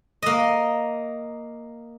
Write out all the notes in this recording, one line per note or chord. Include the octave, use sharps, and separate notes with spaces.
A#3 D#5